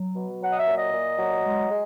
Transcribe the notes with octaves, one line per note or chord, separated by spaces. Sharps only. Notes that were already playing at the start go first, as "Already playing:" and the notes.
Already playing: F#3
B2
F#3 F#5
D#5
E5
A#2
D#5
A#2
F#3
G#3
G#3